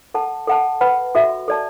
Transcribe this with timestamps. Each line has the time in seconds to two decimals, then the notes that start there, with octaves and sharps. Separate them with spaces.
0.14 A4 F#5 A5
0.48 A4 F#5 A5
0.81 B4 F#5 B5
1.15 F#4 A4 E5
1.48 A4 D5 A5